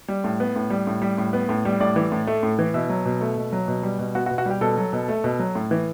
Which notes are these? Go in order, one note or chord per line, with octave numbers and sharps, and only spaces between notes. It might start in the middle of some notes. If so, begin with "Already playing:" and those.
G3
A2
B3
A2
G3
A2
G3
A2
B3
A2
G3
A2 D5
E3
A2
A3
A2
E3
B2 E5
F#3
B2
A3
B2
F#3
B2
G3
B2
B3 F#4
F#4
B2
F#4
G3 G4
B2 A4
F#3
B2
A3
B2
F#3
A2
E3